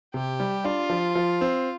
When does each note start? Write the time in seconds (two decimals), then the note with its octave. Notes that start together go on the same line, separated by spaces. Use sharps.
0.14 C3 G4
0.40 G3
0.65 D4 F4
0.90 F3
1.15 F3
1.41 C4